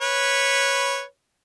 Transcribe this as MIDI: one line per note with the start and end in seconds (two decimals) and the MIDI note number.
0.01 1.02 71
0.01 1.02 73